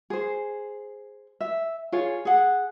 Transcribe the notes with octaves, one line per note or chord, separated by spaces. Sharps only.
G#4 C5
E5
F4 G#4 C#5
G#4 F#5